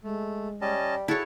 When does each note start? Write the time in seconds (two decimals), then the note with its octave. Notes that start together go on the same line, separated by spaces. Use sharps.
0.04 G#3 A3
0.61 G3 C#4 D#5 A5
1.08 E4 F#4 G#4 A4 C#5 A5